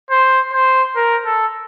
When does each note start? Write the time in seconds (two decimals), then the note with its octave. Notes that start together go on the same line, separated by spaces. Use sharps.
0.11 C5
0.53 C5
0.96 A#4
1.26 A4